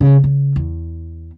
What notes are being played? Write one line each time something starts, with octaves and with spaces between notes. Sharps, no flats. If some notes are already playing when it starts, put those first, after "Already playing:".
C#3
C#3
E2